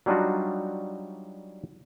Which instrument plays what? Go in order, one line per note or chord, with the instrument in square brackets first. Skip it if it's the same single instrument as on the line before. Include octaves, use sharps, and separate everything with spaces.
[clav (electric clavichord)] F#3 G3 D4 D#4 F4 F#4